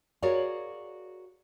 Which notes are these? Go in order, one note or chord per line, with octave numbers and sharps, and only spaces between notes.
F#4 G#4 A#4 C#5 D5 F5